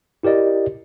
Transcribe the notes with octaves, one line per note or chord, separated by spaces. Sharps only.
E4 G4 A#4 D5 D#5